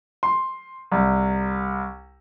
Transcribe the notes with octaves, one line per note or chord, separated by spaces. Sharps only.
C6
C2